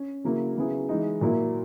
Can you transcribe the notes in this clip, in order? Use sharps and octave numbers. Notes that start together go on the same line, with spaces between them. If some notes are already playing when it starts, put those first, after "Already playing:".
Already playing: C#4
C#3 F#3 A#3 E4
C#3 F#3 B3 E4 G#4
E3 G#3 D#4
A#2 F#3 A#3 E4